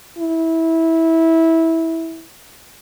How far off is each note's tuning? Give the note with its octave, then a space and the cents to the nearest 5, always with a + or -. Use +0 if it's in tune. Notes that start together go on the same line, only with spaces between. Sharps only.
E4 -15